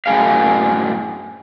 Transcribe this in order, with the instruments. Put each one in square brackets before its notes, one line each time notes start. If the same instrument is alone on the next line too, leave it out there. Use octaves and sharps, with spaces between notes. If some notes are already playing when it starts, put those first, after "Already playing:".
[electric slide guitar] F#2 A2 G#4 F5